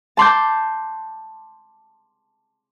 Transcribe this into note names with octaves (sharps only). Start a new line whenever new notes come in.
A5 C6 D6 G6